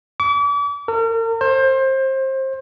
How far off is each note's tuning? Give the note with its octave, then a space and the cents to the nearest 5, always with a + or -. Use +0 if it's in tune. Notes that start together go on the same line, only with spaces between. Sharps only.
D6 -40
A#4 -40
C5 +25